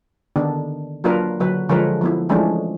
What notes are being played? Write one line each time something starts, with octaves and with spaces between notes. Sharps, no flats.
D3 D#3 B3 D4
F#3 A#3 D4 F4 A#4 B4
D3 F#3 B4
D3 F3 G#3 A#4 B4 C#5
F3 B3 E4
E3 F3 G#3 A3 C#4 D4